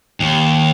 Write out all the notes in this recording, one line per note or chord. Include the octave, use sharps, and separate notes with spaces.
D#2